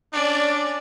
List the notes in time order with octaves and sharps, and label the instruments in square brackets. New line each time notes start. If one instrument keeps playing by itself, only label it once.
[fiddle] C#4 D5 [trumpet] D4